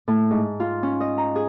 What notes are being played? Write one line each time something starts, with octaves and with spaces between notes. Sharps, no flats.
A2
G#2
F4
C#4
D#5
A#5
G#4